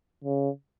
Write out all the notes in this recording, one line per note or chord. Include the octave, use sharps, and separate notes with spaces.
C#3